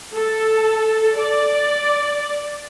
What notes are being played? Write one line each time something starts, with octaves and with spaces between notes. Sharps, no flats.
A4
D5